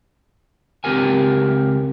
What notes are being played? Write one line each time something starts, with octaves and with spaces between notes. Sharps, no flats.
C#2 C4 G4 A#4 G#5